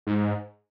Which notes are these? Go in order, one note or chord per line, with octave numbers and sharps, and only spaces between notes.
G#2